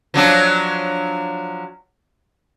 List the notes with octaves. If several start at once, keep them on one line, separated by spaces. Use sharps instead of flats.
F3 F#3 D4